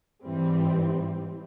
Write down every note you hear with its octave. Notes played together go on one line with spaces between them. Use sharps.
G#2 E3 G3 C4